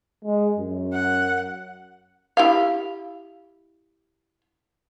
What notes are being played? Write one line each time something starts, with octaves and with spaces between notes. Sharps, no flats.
G#3
F#2
F#5
E4 G4 F5